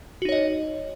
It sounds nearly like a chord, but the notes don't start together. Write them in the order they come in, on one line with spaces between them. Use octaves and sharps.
F#4 D#4 C#5 D#5